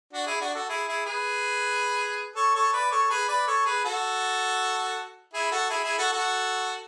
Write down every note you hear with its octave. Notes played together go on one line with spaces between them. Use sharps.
D4 F#4
E4 G#4
D4 F#4
F#4 A4
E4 G#4
E4 G#4
G#4 B4
A4 C#5
A4 C#5
B4 D5
A4 C#5
G#4 B4
B4 D5
A4 C#5
G#4 B4
F#4 A4
E4 G#4
F#4 A4
E4 G#4
E4 G#4
F#4 A4
F#4 A4